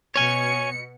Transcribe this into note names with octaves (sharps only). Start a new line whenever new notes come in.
B2 C#5 G#5 C#7